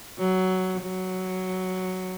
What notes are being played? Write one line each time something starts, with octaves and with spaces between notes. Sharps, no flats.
F#3
F#3